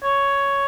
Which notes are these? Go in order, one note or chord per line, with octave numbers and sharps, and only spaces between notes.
C#5